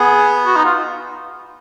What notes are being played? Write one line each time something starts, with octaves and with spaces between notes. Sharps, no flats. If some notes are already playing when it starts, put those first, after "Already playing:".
Already playing: B3 G#4
F#4
D#4
F4